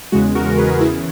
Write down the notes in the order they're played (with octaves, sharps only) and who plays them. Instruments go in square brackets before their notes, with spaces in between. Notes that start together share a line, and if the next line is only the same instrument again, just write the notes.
[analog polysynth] E2 C#3 G#3 F#4
F#4 A#4
G#4 B4
E2 C#3 E3 E4 G#4